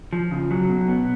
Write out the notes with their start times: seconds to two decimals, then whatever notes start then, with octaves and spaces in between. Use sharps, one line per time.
0.13 F3
0.31 C#3
0.51 F#3
0.69 B2
0.88 B3